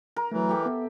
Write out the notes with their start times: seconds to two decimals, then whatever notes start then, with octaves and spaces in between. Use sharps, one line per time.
0.16 A#4
0.32 E3 F#3 A3
0.49 G4 A4
0.63 B3 E5